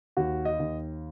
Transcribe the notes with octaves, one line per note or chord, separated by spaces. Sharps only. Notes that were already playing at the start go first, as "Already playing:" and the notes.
D#2 F#4
D#5
D#2